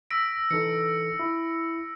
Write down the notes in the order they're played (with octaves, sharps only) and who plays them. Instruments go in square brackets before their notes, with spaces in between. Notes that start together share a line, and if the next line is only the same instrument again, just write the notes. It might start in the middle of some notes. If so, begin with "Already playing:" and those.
[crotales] E6 A#6 D7 [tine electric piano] B6
[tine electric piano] E3 D#4 A4 [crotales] C#7
[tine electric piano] E4